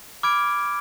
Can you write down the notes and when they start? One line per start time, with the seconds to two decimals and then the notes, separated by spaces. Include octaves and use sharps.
0.23 B5 D6 F6 G#6 D7